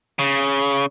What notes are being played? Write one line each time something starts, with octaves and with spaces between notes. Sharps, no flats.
C#3